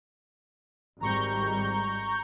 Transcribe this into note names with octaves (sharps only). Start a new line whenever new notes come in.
G#1 G#2 G3 A#5 C#6 G6